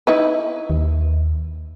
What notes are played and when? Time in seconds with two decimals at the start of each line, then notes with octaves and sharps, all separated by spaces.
0.07 D#4 E4 B4
0.70 D#2